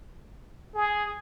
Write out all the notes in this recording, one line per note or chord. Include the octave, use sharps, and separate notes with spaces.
G#4